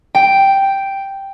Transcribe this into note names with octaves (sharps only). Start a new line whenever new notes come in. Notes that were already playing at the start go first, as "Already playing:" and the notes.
G5